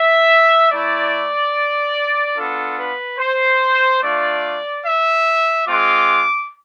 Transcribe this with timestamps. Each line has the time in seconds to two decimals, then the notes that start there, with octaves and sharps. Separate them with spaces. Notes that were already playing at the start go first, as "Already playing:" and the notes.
Already playing: E5
0.71 A3 E4 D5
2.36 B3 D4 F4 A4
2.78 B4
3.18 C5
4.02 A3 D4 F4 D5
4.85 E5
5.66 G#3 C4 F4 D6